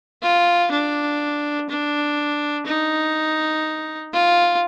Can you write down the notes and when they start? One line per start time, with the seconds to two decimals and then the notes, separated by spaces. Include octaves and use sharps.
0.23 F4
0.71 D4
1.69 D4
2.66 D#4
4.13 F4